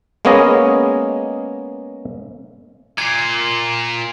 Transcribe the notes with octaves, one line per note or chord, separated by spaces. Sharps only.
G#3 A#3 B3 C#4 G#4 D#5
A#2 G#6 C7